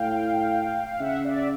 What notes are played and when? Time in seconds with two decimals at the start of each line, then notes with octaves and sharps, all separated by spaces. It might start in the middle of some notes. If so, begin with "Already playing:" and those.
Already playing: A2 F5 G5
0.88 F5
0.99 C#3 E5 F#5
1.25 D5 E5